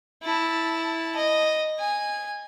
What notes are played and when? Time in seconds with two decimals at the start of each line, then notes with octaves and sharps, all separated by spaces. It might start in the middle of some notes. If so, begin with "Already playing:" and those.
0.23 E4 A5
1.16 D#5
1.79 G#5